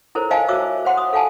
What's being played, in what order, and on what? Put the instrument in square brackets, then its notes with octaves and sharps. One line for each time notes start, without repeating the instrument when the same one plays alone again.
[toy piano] E4 A4 A#4 C5 C#5
C5 D#5 F5 G#5 A5
F#4 C#5 E5 D6 E6
C5 C#5 F#5 C6
D#6
A4 F5 F#5 G#5 A5